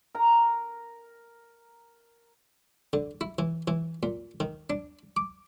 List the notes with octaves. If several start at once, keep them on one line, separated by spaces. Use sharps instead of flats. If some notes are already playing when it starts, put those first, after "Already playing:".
A#4 A#5
D3
E4
E3
E3
A#2
D#3
D4
D6